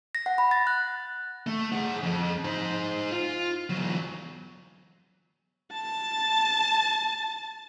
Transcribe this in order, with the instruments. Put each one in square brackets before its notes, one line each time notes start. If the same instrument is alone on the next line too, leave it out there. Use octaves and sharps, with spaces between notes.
[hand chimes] A#6
F#5
B5
A6
F#6
[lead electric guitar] A3
G#4 F#5
F2
D#4 C5
F4
E2 F#3
[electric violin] A5 A6